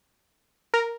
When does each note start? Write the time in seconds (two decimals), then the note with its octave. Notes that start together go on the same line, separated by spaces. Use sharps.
0.74 A#4